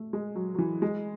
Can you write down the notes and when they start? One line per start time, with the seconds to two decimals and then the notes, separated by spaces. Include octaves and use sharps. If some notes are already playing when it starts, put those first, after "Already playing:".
Already playing: A3
0.13 G#3
0.35 F#3
0.55 F#3
0.58 E3
0.82 G#3